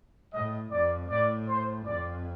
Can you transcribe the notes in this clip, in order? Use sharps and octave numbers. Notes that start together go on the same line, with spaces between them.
A2 D#5
F2 D5
A2 D5
C5
F2 D5